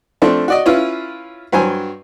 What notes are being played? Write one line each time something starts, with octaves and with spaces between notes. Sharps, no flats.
F3 A3 C4 D4
F#4 D5 D#5
C#4 E4 F4 B4
G2 F#3 C5 G#5